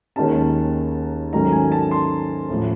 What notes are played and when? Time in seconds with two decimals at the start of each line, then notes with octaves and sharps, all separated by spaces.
0.16 D#2 D#3 G#3 C#4 A5
1.33 G#2 D#3 F#3 A3 C#4 A#5
1.52 G#5
1.72 A5
1.91 C6
2.49 A1 A2 F3